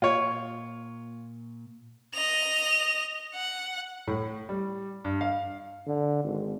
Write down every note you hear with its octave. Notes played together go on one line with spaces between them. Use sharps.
A#2 F4 C#5
D#5 F7
F#5
A2
G3
G2
F5
D3
G#1